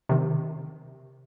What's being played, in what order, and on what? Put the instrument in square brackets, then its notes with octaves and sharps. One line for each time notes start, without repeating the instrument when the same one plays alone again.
[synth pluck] C3 D#3